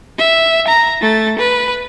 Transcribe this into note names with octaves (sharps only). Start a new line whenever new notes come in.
E5
A#5
A3 A6
B4